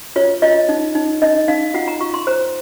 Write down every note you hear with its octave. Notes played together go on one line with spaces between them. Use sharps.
F4 C#5
F4 D#5
D#4
D#4
D#4 D#5
D#4 F5
F4 F#5
A#5
F4 C#6
C6
C5 A#5